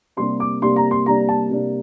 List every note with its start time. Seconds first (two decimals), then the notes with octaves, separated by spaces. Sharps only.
0.17 C3 G3 A#3 D4 C6
0.40 D6
0.62 C3 G3 A#3 D4 C6
0.76 A#5
0.91 C6
1.06 C3 G3 A#3 D4 A#5
1.29 A5
1.50 C3 G3 A#3 D4